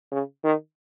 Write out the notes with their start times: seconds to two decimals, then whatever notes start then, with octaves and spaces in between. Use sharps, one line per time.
0.12 C#3
0.44 D#3